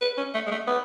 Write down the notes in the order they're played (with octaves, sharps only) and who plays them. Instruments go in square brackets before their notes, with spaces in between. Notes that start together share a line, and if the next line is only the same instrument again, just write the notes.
[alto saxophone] B4
C#4
A3
G#3
A3
B3